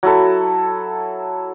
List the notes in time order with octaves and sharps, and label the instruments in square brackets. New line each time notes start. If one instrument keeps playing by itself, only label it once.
[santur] F#3 E4 A4